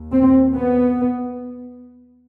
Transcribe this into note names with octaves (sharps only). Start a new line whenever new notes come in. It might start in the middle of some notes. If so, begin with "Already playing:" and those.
Already playing: D#2
C4
B3